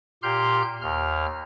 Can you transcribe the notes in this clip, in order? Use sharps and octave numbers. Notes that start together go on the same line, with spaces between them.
A#2 G4 C6 F6 G6
D#2 F6